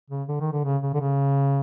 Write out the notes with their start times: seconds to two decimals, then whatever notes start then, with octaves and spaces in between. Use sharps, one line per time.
0.10 C#3
0.28 D3
0.40 D#3
0.52 D3
0.65 C#3
0.83 C#3
0.94 D3
1.00 C#3